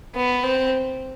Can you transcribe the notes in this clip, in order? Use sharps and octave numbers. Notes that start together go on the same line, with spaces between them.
B3
C4